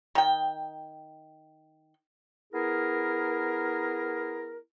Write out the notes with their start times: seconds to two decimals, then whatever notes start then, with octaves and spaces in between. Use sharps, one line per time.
0.15 D#3 G5
2.53 B3 E4 G#4 A#4